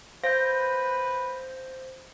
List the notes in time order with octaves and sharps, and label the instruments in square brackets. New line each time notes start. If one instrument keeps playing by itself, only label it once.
[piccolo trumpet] B4 [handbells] C5 A#6 [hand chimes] F5 G6